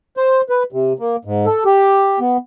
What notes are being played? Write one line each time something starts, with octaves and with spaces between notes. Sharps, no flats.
C5
B4
C3
A#3
G#2
A4
G4
B3